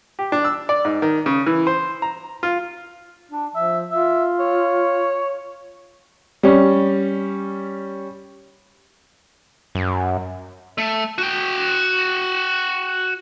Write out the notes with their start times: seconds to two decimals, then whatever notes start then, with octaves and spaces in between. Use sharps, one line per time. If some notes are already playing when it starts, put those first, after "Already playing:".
0.19 G4
0.32 D4
0.45 E6
0.69 D5
0.85 G#2
1.02 D#3
1.26 C#3
1.47 E3
1.67 C5
2.02 A#5
2.43 F4
3.32 D4
3.55 F3 E5
3.91 F4 E5
4.40 C#5
6.43 G3 C#4
9.75 F#2
10.78 A3
11.18 F#4 G5